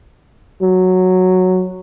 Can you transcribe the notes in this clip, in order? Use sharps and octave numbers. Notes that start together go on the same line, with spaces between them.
F#3